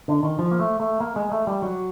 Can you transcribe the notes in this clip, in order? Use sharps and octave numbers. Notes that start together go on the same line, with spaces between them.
D3
D#3
F3
A#3
A3
A3
A#3
G#3
A3
G3
F#3